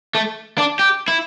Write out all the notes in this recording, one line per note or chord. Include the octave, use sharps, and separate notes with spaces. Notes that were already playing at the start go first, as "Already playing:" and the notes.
A3
D4
G4
E4